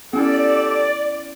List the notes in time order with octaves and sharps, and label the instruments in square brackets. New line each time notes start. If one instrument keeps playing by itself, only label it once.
[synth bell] B3 C#4 E4 [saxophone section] G4 A4 [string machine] D5